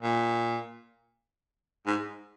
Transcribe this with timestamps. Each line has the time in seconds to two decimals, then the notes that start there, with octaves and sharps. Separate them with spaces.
0.02 A#2
1.87 G#2